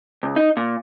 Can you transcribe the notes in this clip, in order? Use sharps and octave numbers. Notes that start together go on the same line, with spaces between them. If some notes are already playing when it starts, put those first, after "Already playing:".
C#2
D#4
A#2